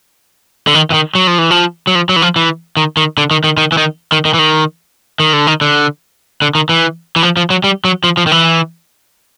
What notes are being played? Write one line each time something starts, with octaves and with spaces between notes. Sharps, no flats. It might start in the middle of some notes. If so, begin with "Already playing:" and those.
D3
D#3
E3
D#3
F#3
F3
E3
F3
F#3
F3
F#3
E3
F3
E3
D#3
D#3
D3
D#3
D#3
D#3
E3
D#3
D#3
D#3
E3
D#3
D#3
D3
D#3
D3
D3
D#3
E3
E3
F3
F3
F#3
G3
F#3
F3
F3
D#3
E3